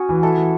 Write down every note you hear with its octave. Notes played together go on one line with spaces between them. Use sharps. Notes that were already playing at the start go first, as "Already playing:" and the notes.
Already playing: C#4 F#4 G#4
E3
E4 A4
E3